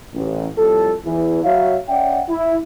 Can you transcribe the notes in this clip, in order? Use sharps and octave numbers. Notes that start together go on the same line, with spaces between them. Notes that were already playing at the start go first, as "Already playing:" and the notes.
A1
F2 A2 G3 A4
E2 E3
F#3 C#5 E5 F5
C#4 D5 E5 F#5 G5
E4